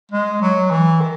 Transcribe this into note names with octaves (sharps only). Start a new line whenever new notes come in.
G#3
F#3
E3
D#3